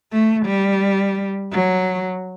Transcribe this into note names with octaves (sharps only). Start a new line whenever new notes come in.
A3
G3
F#3